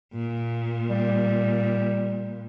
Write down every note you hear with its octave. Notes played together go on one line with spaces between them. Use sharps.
A#2
G3